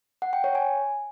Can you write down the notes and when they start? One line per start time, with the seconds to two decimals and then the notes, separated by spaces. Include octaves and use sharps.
0.22 F#5
0.33 G5
0.44 C#5
0.55 G#5